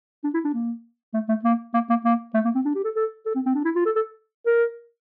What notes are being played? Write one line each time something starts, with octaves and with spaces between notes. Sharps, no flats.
D4
E4
D4
A#3
A3
A3
A#3
A#3
A#3
A#3
A3
A#3
C4
D4
G4
A4
A4
A4
C4
C4
D4
E4
F4
A4
A4
A#4